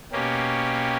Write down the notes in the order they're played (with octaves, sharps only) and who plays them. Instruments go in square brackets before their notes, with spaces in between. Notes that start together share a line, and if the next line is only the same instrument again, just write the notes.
[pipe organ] B2 A#3 C#4 G4